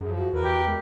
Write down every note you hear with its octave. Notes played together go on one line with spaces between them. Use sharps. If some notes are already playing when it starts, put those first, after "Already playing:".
F#2 F3 G#4
F#4
E2 A#4 B4
G4
G#3